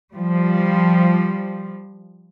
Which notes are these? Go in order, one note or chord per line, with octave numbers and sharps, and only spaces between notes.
F3 G3